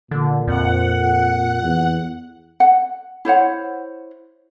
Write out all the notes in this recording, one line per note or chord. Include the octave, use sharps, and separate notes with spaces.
A#2 D3
F2 F#5
E2
F#5
E4 C5 C#5 F#5